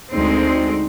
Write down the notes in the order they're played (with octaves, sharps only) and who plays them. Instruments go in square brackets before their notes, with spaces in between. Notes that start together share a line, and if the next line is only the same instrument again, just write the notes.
[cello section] D2 G#3 C4 [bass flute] D#4